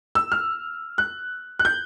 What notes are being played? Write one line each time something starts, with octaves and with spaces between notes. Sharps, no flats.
E6
F6
F#6
F#6
G6